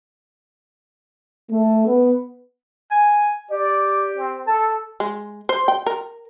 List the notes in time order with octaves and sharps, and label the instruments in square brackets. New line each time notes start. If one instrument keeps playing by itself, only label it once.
[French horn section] A3
B3
[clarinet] G#5
[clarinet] G4 [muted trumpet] D5
[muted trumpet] C4
[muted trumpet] A4 [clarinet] A5
[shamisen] G#3
C5
G5
A#4